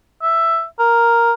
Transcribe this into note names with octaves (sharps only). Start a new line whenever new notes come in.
E5
A#4